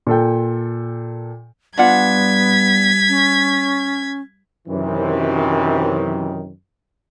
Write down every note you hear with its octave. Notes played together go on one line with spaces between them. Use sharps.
A#2 A4 G5
G3 B3 D4 F4 F#5 G#6 B6
C#4
F#2 C3 D#3 E3